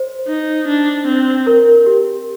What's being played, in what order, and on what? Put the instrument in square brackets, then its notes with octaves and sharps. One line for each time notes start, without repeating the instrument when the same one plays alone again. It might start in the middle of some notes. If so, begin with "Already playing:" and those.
Already playing: [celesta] C5
[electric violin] D#4
D4
C4
[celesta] A#4
G4